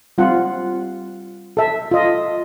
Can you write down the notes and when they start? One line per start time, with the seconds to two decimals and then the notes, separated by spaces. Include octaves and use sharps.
0.18 G3 C4 F4 F#5
1.57 A4 E5
1.91 F4 D#5